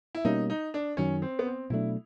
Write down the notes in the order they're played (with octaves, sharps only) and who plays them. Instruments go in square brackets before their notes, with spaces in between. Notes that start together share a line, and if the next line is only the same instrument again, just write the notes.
[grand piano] E4
[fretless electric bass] B2 G3 A#3 C#4 [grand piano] D#4
[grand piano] D#4
D4
[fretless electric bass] F#2 D#3 F#3 [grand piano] C#4
[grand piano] C4
B3
C4
[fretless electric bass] B2 F#3 A3 D4 [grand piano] E4